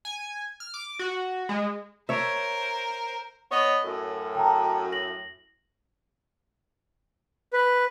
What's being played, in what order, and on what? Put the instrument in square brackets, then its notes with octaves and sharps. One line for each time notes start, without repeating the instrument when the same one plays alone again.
[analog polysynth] G#5
F6
D6
F#4
G#3
[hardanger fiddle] A#4 C5 [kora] C#5 E5
[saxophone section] B3 C#5 D#5
F#2 A2
[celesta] G5 A5 A#5
A#6 F#7
[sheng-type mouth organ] B4